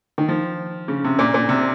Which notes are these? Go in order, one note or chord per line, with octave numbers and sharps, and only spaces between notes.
D#3
F3
C#3
C3
A#2
A#2
C3